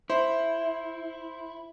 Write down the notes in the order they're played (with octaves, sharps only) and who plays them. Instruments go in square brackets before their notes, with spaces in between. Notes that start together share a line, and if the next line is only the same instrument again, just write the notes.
[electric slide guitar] E4 [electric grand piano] C5